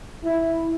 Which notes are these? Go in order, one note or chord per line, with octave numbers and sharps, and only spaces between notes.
E4